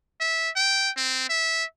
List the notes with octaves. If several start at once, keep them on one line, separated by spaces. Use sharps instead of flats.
E5
G5
C4
E5